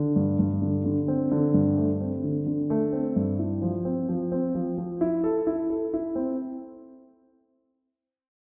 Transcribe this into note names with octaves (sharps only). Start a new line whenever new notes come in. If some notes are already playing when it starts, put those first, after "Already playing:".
Already playing: D3
G2
G2
D3
D3
C4
D3
G2
A3
C4
D3
D3
A3
C4
G2
E4
F3
C4
F3
C4
F3
F3
E4
A4
E4
A4
E4
C4